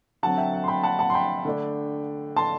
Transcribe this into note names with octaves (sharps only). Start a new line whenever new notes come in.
D3 F#3 C4 F#5 A5
E5 G5
F#5
C6
G5 B5
F#5 A5
F#5 A5
C6
G5 B5
D3 A3 D4
A5 C6